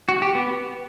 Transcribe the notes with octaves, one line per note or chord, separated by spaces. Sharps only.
F#4
G4
B3